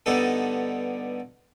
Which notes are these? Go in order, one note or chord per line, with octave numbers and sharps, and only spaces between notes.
G2 D3 B3 D#4 A4